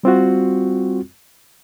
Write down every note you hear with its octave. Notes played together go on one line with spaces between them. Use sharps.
G3 C4 F4 F#4